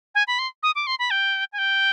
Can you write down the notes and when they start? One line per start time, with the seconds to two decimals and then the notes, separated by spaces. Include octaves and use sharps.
0.15 G#5
0.27 B5
0.39 C6
0.63 D#6
0.75 D6
0.87 C6
0.99 B5
1.11 G5
1.53 G#5
1.58 G5